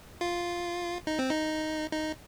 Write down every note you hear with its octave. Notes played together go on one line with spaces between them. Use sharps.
F4
D#4
C4
D#4
D#4